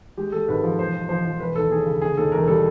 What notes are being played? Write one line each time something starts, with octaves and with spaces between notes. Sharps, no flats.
G#3 G4
G#3 A4
G#1 B4
F3
E1 C5
F3
F3 C5
F3
E1 B4
D#2 A4
D#2 G#4
C#3
D3 G#4
D#2 A4
E1 A#4
G3 A4